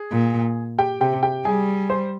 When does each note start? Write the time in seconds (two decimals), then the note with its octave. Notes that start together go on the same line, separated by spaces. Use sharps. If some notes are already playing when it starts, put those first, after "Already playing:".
Already playing: G#4
0.12 A#2
0.78 G4 G5
1.01 C3 G4 G5
1.23 G4 G5
1.45 G3 G#4 G#5
1.90 C5 C6